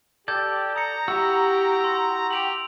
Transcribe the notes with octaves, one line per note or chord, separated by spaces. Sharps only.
G4 A4 D5 G6 G#6
A#5 D#6 C#7
E4 F#4 G4 E6
C6 E6
G4 D7 F7 F#7